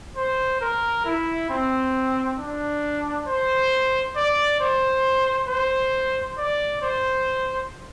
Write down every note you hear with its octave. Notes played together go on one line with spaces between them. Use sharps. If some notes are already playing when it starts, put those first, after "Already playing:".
C5
A#4
E4
C4
D4
C5
D5
C5
C5
D5
C5